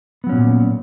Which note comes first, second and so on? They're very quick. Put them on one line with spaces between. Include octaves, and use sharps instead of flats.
B3 F#3 C#4 A#2